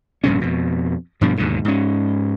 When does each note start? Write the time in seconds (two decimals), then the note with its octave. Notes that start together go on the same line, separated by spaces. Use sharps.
0.24 A#1 G2 C3 C#4
0.41 F2 B2
1.21 G2 B2 F3 D4
1.38 D#2 G#2 B2 D3
1.65 G#2 C#4